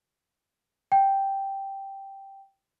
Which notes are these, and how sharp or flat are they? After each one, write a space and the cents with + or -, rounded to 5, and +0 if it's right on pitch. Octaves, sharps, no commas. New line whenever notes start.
G5 -5